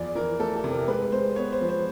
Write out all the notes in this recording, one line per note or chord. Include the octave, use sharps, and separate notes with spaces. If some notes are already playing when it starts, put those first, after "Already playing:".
Already playing: E2 F3 D5
E3 A#4
A3 A4
A4
C3
A#4
G#3 B4
G#3 C5
B3 C#5
C5
F3
C5